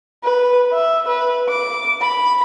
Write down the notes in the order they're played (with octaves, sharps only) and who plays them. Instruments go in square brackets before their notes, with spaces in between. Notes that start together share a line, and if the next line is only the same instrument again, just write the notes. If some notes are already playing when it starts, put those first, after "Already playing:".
[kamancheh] B4
E5
B4
D6
B5